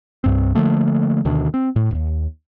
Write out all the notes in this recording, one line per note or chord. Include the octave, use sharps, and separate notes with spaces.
C2 G2 C4
D3 F3 A3 A#3
D2 B2 D#3 D4
C4
A2
D#1 D#2